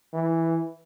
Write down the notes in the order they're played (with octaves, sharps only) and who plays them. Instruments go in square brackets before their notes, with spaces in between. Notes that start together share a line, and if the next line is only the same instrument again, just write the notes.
[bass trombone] E3